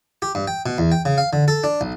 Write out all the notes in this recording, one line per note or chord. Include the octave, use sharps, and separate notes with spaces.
G4
G2
G5
B2
E2
G5
C#3
F5
D3
A4
D4
B1